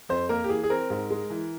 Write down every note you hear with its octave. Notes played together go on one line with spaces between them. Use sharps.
F2 C5
A#3 A#4
G4
E3 G#4
G#4
C4 A#4
G#2
G#3
E3